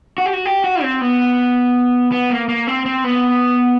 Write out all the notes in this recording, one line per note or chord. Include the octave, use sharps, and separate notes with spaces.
F#4
G4
F#4
G4
F#4
C4
B3
B3
A#3
A#3
C4
C4
B3